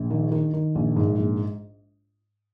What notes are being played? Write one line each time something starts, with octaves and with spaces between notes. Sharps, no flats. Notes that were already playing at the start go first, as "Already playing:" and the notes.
Already playing: A#1
D#3
D#3
D#3
A#1
G#2
A#1